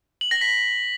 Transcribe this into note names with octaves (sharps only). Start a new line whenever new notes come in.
F#7
A#6
B6